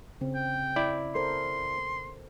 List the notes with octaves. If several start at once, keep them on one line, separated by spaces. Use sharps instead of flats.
C#3 C4
G5
E4 D5
A4 A#4 C5 C6